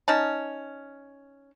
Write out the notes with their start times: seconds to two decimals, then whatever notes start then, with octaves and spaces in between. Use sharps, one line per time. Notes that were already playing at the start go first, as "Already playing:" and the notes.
0.08 C#4 D#4 A5